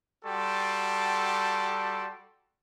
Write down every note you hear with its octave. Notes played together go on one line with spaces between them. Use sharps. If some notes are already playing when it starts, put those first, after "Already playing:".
G3 F#4 A4 G5 A5 C6